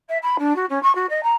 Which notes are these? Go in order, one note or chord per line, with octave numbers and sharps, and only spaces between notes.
E5
B5
D4
F#4
C#4
C#6
F#4
D#5
A#5